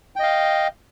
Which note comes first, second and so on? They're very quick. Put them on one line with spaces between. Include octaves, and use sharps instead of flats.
G5 D#5 F5